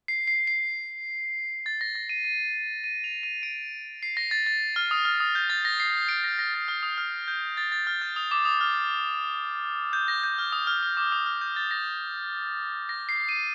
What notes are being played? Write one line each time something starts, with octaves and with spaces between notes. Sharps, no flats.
C7
C7
C7
A6
A#6
A#6
D#7
D#7
D#7
F7
D#7
D7
C7
A#6
A6
A6
F6
D#6
F6
D#6
G6
A6
A#6
C7
D7
A#6
A#6
A6
F6
D#6
F6
G6
A6
A6
F6
G6
D#6
D6
D#6
F6
G6
A#6
G6
F6
D#6
F6
F6
D6
D#6
F6
G6
A6
A#6
A#6
C7
D#7